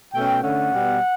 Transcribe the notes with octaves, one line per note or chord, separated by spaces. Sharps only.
B2 A3 C#4 G5
D3 A3 C#4 F#5
B2 G3 B3